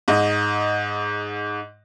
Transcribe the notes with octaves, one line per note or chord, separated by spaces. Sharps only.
G#2 D#5